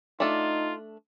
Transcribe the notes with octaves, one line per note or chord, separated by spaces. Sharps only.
A3 D4 D#4 F4 A4